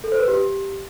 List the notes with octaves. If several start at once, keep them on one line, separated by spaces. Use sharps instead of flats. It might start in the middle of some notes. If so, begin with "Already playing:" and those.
A4
C5
B4
G4